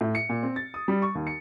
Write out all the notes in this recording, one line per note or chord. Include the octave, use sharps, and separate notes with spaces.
A2
C#7
A#2
C4
A6
D#6
G3
C#6
D#2
C#7